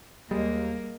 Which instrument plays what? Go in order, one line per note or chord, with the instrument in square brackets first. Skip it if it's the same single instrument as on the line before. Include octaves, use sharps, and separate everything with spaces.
[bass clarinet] D#2 [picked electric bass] G3 [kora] G#3 [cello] A#3